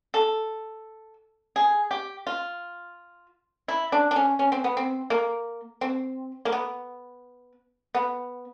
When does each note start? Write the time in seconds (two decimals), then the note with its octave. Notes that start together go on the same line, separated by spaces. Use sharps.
0.14 A4
1.56 G#4
1.91 G4
2.27 F4
3.68 E4
3.92 D4
4.11 D4
4.16 C#4
4.39 C#4
4.52 C4
4.64 B3
4.77 C4
5.10 A#3
5.81 C4
6.45 A#3
6.52 B3
7.95 B3